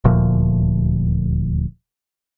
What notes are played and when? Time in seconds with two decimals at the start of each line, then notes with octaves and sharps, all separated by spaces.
0.04 D#1 D2 A#2 F3